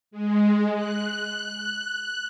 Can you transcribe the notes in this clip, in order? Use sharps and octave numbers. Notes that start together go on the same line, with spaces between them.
G#3
F#6